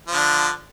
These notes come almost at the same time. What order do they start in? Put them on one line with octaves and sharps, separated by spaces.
F3 D3 D4